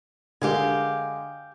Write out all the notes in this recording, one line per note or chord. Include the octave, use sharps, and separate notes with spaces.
D3 G#3 G4 A#4 F5 G#5